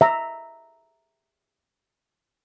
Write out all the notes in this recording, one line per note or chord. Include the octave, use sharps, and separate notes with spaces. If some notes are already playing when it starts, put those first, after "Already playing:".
E5 A#5